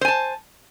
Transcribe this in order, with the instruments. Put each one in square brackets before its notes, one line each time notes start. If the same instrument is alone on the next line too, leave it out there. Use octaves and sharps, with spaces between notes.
[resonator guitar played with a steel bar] C5
G#5
A5